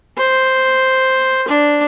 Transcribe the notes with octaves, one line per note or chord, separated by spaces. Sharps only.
C5
D4